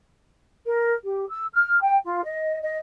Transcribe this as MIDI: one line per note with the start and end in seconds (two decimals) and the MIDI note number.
0.66 0.92 70
1.04 1.26 67
1.29 1.45 88
1.53 1.78 89
1.80 1.97 79
2.04 2.23 65
2.24 2.57 75
2.61 2.76 75